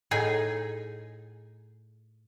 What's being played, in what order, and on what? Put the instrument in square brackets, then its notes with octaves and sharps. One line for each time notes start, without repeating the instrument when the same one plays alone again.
[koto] A2 D#4 G#4 G#5